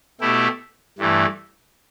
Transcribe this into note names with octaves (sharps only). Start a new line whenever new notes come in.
B2 A3 E4 G4
G2 E3 A3